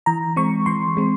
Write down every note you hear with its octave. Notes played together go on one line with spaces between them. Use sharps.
E3 A#5
G#3 C4 C#6
E3 C6
G#3 C4